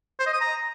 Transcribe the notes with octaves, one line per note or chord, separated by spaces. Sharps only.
C5
D#5
D#6
A#5